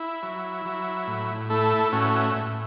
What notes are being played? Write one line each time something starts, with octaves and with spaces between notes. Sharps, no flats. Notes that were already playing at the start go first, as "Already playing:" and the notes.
Already playing: E4
F#3
F#3
A2
A3 E4 A4
A2 C#4 F#4
A2